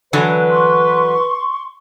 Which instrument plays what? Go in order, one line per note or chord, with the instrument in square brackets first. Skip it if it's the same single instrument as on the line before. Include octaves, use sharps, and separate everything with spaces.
[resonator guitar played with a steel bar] D3 E3 F#3 [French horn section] B4
[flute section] C6 C#6